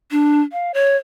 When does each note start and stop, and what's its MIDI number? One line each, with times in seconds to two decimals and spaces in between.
0.11 0.41 62
0.52 0.72 77
0.74 0.96 73